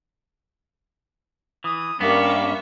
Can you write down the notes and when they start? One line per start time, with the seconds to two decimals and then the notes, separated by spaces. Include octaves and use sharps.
1.64 E3 D#6
2.00 G2 G3 A#3 B3 C#4 E5 C#6 D6